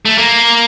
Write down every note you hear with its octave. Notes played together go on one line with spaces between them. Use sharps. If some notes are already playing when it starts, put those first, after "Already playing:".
A3
A#3